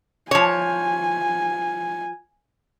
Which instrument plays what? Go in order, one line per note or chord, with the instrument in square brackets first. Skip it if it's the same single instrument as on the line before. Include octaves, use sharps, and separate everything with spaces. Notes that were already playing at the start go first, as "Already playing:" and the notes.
[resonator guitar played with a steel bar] F3 C#5 [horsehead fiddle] G#5